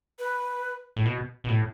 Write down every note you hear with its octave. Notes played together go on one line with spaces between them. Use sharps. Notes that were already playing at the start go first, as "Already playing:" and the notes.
B4
A2
B2
B2
A2